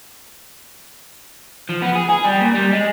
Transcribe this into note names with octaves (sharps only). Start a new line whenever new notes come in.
F3
B3
G#4
G#4
G3
A#2
G3
G#3